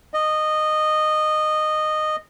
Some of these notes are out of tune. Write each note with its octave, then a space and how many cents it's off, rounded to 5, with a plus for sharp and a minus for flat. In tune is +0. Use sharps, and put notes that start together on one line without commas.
D#5 -15